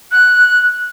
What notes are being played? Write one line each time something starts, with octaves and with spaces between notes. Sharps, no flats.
F#6